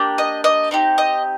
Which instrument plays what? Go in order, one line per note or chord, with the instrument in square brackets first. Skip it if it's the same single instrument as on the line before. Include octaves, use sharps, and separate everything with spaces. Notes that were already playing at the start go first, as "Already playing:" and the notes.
Already playing: [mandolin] A#3 D4 G4
D#5
D#5
C4 D#4 G4
D#5